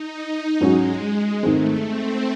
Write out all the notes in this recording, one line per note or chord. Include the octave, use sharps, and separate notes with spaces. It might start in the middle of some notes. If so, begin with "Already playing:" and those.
Already playing: D#4
D#4
G#2 F#3 G#3 C#4 F#4
G#2 D#3 G#3 A3 C4
C4